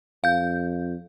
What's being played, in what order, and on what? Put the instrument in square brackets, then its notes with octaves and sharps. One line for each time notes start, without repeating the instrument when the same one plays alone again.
[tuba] F2 [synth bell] F5 G6